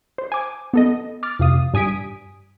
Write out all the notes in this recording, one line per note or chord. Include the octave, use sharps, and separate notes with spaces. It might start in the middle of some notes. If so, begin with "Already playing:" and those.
C5
G#5 D6
B3 A4 D#5
D6 F6 A6
F2 C3 F5 D#6
G2 G#5 D#6 B6 D7